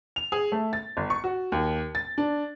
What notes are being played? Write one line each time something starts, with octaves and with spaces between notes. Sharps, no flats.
F7
G#4
A3
A6
G1
C#6
F#4
D#2
A6
D4